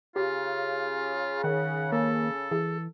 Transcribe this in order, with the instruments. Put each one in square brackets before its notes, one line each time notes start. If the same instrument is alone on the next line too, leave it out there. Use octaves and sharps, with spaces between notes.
[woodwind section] C#3 [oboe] F4 [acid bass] G4
[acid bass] D#3 [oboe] F#5
[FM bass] A#3 [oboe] A4
[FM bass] E3 [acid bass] G#4